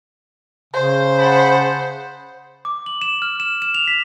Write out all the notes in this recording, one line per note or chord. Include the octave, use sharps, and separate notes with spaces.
C#3 C5
F#5 A5 B5
D6
F#7
E7
F6
E7
E7
F7
B6